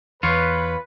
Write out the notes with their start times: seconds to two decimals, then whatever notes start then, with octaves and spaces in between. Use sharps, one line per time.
0.23 E2 F4 B4 C#5